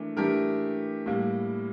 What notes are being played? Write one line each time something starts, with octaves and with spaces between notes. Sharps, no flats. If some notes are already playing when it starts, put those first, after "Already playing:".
Already playing: E3 A3 D4 A#4
E3 A3 D4 G4 A#4
A2 G3 A#3